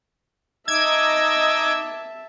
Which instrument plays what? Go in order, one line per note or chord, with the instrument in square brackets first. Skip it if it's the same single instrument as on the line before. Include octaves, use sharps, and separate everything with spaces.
[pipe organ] D#4 D#5 D6 [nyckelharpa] E5 A5 [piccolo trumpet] E6 [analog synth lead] G#6